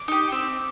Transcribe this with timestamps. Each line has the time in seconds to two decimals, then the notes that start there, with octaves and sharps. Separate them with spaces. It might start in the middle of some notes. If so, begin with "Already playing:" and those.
Already playing: D6
0.08 D#4 G4
0.32 C4